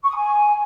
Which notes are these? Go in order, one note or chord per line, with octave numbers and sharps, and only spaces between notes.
C#6
D#6
G#5